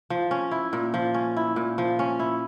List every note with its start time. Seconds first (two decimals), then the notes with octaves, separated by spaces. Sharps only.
0.10 F3
0.31 C#4
0.51 E4
0.73 A#2
0.94 F3
1.14 C#4
1.37 E4
1.56 A#2
1.78 F3
1.99 C#4
2.19 E4